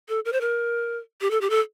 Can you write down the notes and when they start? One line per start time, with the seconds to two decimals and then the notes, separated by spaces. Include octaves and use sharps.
0.09 A4
0.25 A#4
0.32 C5
0.41 A#4
1.21 G4
1.31 A4
1.41 G4
1.50 A4